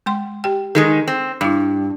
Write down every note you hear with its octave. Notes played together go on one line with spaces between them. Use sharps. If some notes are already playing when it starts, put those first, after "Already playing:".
G#3 G5 C6
G4 G5
D#3 G#3 D#4 A4
C4
G2 D4 E4